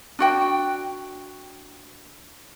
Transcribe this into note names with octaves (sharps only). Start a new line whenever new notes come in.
D4 F#4 G5